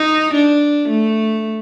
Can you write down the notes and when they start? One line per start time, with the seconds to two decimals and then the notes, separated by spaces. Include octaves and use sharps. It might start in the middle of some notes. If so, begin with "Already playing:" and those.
Already playing: D#4
0.34 D4
0.89 A3